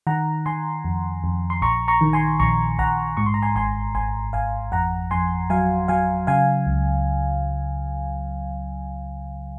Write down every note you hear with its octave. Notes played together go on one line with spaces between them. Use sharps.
D#3 F#5 A#5
D#3 G#5 C6
F2
F2
C6
A#1 A#5 C#6
A#5 C#6
D#3
G#5 C6
A#1 A#5 C#6
A#1 F#5 A#5
G#2 C#6
C6
A#5
G#5 C6
G#1 G#5 C6
G#1 G#5 C6
G#1 F5 G#5
F2 F#5 A#5
F2 G#5 C6
F#3 F5 G#5
F#3 F5 G#5
C#3 F5 G#5
C#2